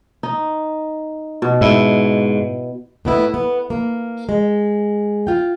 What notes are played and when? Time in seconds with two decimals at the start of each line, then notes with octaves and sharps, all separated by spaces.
0.23 D#4
1.42 B2
1.61 G#2 E4 E5
3.05 A2 B3 E4
3.34 B3
3.70 A#3
4.29 G#3
5.27 F4 G5